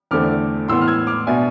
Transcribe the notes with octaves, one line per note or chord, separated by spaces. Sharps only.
E2 D3 A3 C4 D6 F6
A2 E3 B3 C6 E6
F6
E6 G#6
D6 F6
B2 B3 D4 E5 G#5